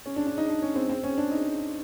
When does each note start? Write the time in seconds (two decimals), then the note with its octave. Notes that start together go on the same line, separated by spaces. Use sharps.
0.06 C#4
0.16 D4
0.27 D4
0.38 D#4
0.48 D4
0.62 C#4
0.75 C4
0.89 C4
1.04 C#4
1.18 D4
1.31 D#4